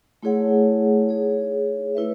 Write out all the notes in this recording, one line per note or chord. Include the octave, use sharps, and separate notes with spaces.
A3 E4 G#4 C#5 F#5
D#4 G#4 C#5
A3 E4 B4 E5